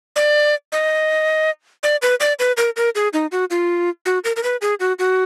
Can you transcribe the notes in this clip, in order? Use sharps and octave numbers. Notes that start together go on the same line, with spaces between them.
D5
D#5
D5
B4
D5
B4
A#4
A#4
G#4
D#4
F#4
F4
F#4
A#4
A#4
B4
G#4
F#4
F#4